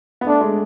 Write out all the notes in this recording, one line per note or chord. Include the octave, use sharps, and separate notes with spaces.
B3
A3 D4
G#3